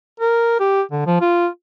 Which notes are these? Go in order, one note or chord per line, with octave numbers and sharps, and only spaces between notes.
A#4
G4
D3
F3
F4